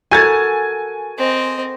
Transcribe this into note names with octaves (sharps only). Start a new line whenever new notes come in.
F#4 A4 A#4 G#5 G#6 A6
C4 D#5